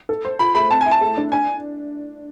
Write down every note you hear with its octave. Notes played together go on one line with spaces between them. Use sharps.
A4
C5
F4 B5
A3 B5
C4 A5
G#5
E4
A5
A3
D4
D4 G#5